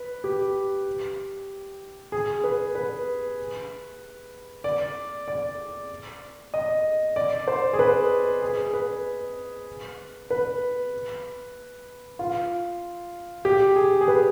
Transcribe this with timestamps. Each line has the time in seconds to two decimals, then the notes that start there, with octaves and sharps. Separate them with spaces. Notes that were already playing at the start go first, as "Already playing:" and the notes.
Already playing: B4
0.24 G4
2.12 G#4
2.44 B4
2.75 B4
4.64 D5
5.28 D5
6.54 D#5
7.16 D5
7.48 C5
7.73 G#4
7.79 B4
8.42 G#4
8.74 B4
10.30 B4
12.19 F4
13.45 G4
13.76 G#4
14.01 G#4
14.08 B4